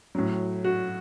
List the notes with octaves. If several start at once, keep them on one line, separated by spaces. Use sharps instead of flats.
A2 F#3
F#4